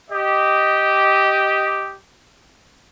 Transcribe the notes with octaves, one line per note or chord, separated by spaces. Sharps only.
G4 D#5